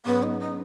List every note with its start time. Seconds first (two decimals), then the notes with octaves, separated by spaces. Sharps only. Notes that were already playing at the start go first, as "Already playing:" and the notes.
0.06 G#2 F#3 B3 C#4 G#4 C#5
0.23 D#4
0.40 D#4